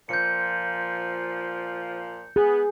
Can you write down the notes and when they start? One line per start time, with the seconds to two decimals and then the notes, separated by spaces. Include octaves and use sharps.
0.09 A#2 F3 G6 C#7
2.36 B3 G#4